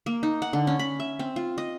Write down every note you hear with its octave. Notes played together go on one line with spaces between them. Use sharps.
A#3
D#4
F#5
D3
C#4
B5
E5
C4
F4
D#5